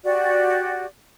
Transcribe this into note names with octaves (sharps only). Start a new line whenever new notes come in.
F#4 G4 D5